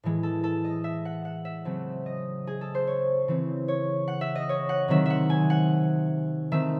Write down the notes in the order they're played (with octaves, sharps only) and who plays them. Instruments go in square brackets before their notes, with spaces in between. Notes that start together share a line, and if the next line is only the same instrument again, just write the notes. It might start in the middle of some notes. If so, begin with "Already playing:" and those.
[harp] A2 E3 G#3
A4
A4
D#5
E5
F#5
F#5
E5
C#3 F#3 A3 C4
D#5
G#4
A4
C5
C#5
C#3 E3 C4
C#5
F#5
E5
D#5
C#5
F#5
C3 D#3 F#3 C4 E5
E5 F#5
G#5
F#5
D#3 A3 C4 E5